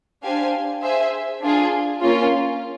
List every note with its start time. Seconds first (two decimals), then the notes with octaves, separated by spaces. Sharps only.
0.23 D4 G4 C5 F5 G#5
0.82 G#4 C5 E5 G#5
1.42 D4 F4 G#4
2.01 A#3 C#4 F4